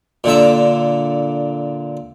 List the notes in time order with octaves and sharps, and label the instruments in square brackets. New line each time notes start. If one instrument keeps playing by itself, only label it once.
[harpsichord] A#2 D3 E5